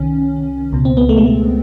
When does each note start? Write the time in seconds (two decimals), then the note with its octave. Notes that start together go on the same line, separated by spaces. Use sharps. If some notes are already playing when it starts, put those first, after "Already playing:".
Already playing: C2 C3 D#3 C#4
0.73 C#2 B2
0.85 C4
0.97 B3
1.09 A3
1.18 G#3
1.26 A3